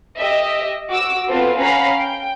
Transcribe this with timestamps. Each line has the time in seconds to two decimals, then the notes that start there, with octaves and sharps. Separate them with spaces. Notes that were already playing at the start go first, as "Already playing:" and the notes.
0.17 G4 D#5 E5
0.89 F#4 D6 E6
1.27 B3 C4 F4 A4 B4 C5
1.60 C#4 C#5 F5 F#5 A#5 B5
1.98 G5